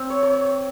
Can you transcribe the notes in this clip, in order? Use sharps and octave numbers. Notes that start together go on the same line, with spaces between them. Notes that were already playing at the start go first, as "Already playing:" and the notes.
Already playing: C4
C#5
C#5